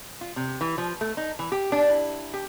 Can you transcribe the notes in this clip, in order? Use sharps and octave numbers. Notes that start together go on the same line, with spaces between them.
F4
C3
E3
F3
A3
D#4
E3
G4
D4
E4
G4